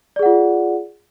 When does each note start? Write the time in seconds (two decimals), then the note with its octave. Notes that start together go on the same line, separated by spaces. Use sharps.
0.16 D5
0.19 G#4
0.23 F#5
0.26 F4